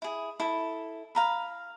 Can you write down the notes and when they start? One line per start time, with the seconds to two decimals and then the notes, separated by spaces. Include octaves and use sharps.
0.02 E4 G#4
0.40 E4 A4
1.15 F5 A#5 B5